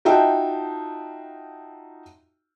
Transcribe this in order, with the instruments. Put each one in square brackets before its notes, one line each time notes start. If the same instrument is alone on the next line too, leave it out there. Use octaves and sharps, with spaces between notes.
[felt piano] D#4 F4 F#4 E5 G5 A5